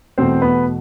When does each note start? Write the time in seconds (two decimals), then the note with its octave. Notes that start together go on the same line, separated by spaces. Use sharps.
0.18 E2 B2 A3 C4 C5
0.42 B3 B4